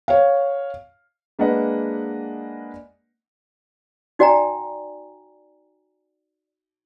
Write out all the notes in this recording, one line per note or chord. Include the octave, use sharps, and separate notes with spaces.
C#5 F5
G#3 A#3 D4 B4 D#5 F#5
D#4 F#4 D5 G5 G#5 A#5